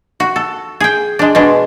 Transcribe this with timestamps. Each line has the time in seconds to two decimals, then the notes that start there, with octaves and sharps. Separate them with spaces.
0.20 F#4
0.36 A4
0.80 G#4 G5
1.19 G#3 D4
1.35 B2 G#3 D4